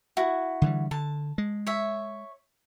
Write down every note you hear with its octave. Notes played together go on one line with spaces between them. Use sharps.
E4 F#4
D3 E3 G3
D3 A5
G#3
C#5 E5